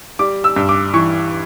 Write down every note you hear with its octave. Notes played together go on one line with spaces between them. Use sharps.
G3 D6
E6
G2
D6
E3 C#6